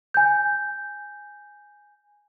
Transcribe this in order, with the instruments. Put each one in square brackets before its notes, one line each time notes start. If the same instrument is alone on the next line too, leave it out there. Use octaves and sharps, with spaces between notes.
[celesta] G#5 G6